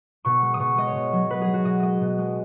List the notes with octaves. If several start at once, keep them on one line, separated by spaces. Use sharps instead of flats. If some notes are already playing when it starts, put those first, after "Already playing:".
B2 C#6
G#3
D#6
B2 C#6
G#3 D#5
C#5
B2
F#3
B2 B4
G#4
F#3
F#4
B2 D#5
G#3 D#5
B2
G#3